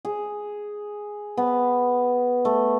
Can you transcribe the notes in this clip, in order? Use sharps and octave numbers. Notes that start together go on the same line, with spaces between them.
G#4
B3
A3